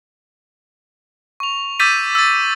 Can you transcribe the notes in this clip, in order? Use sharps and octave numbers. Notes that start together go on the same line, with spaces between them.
C#6 F7
D6 E6 G6 A6 B6 D#7
E6 A6